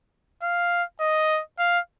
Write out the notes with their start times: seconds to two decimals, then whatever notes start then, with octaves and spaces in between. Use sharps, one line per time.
0.43 F5
1.01 D#5
1.59 F5